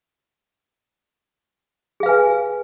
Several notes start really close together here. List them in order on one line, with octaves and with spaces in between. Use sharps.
G#4 F5 B4 G#5